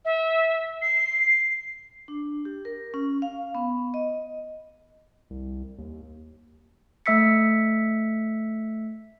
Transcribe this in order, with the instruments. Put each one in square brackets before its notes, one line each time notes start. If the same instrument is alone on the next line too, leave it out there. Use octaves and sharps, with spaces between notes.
[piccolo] E5
C7
[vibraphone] D4
G4
A#4
C#4
F5
B3
D#5
[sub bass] C2
D#2
[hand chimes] A3 E5 E6 B6 C#7